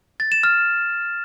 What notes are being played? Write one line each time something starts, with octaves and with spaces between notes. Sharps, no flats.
A6
E7
F6